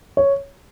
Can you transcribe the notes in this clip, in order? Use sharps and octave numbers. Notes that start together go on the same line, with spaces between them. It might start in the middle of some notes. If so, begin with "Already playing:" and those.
C#5